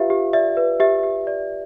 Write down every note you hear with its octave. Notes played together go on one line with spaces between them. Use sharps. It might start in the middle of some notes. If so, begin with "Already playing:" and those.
Already playing: F4 G4 B4 E5 F5
G4
D5 E5
B4
G4 E5
G4
D5